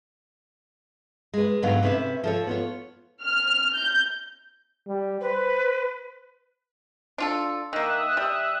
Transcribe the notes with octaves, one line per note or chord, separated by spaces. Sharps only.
G#3 B4
G#2 D3 F#3 G#3 B3 F5
C3 C#4 B4 C5 E5
F3 A4 C#5
B3 F4 C#5
F6
G6
G3
B4 C5
D4 F4 A4
D#3 A#3 E5 D#6 F#6
G3